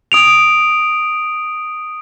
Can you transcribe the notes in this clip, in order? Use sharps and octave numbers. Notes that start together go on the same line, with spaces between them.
D#6 D7 F7